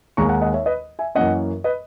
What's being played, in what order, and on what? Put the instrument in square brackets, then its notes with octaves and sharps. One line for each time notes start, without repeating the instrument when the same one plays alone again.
[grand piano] D#2 D#3 G#3 A#5 C#6
F#5 A#5
D#5 F#5
C#5 E5
B4 D#5
E5 G#5
F#2 E3 A#3 C#4 D#5 F#5
B4 D#5